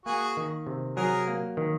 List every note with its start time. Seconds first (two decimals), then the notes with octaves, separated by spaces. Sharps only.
0.05 A#3 F#4 G#4
0.37 D#3
0.67 C3
0.97 F#3 G#4 A#4
1.28 A#3
1.57 D#3